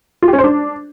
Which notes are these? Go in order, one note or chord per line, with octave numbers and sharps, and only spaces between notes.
F4
G4
C#4
C5
D4